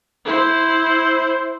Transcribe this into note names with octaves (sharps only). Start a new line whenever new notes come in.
E4 C5